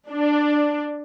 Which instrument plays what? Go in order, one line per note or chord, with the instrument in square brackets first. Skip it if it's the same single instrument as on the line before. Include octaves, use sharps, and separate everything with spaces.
[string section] D4